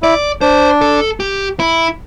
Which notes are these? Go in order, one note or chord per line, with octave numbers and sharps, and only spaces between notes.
E4 D5
D4 C5
A4
G4
E4